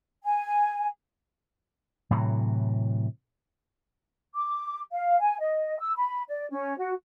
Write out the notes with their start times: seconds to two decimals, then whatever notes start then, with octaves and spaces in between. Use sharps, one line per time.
0.24 G#5
2.11 A2 C3 E3 F#3
4.34 D6
4.93 F5
5.20 G#5
5.40 D#5
5.79 E6
5.96 B5
6.29 D5
6.51 C#4
6.77 F#4